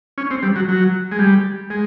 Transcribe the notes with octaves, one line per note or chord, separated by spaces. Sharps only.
C#4
C4
G3
F#3
F#3
G#3
G3
G#3